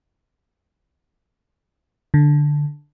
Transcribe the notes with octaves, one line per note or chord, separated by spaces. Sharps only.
D3